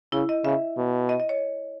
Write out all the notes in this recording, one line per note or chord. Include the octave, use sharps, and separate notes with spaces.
C#3 E4
D#5
C#3 E5
B2
D#5
D#5
C#5